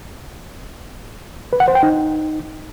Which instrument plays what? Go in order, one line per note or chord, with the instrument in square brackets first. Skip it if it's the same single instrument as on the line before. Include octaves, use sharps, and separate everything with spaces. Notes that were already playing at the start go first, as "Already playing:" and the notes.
[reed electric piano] B4
F#5
C5
G5
D#4